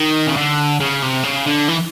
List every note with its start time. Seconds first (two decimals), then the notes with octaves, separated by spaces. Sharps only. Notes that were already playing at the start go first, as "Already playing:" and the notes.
Already playing: D#3
0.27 C#3
0.36 D3
0.80 C#3
1.03 C3
1.24 C#3
1.47 D3
1.69 E3